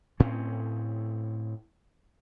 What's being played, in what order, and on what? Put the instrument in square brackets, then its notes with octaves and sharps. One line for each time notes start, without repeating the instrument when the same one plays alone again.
[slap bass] A2 C4 C#4